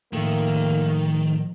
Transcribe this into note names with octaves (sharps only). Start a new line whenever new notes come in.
A2 D#3 F3 A#3 A4 E5